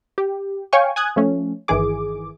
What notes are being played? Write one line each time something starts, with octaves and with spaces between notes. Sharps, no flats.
G4
C#5 F5 G5 G#5 C#6
G#5 D#6 F#6 G#6
F3 A3 C#4
G1 D#3 E3 G#4 D6